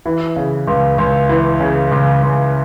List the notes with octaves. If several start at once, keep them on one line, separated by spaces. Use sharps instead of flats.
E3
C#3
C#2
C#2
E3
C#3
C#2
C#2